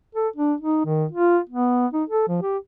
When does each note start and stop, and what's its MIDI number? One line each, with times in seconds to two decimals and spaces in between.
0.15 0.28 69
0.36 0.54 62
0.60 0.84 63
0.85 1.05 51
1.12 1.39 65
1.50 1.87 59
1.93 2.04 63
2.09 2.27 69
2.28 2.39 53
2.42 2.58 67